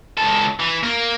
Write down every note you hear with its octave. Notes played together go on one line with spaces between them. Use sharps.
C#2 A4
E3
A#3